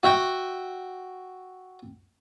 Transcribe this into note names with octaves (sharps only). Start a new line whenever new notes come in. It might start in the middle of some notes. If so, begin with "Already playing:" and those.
F#4 E5 G5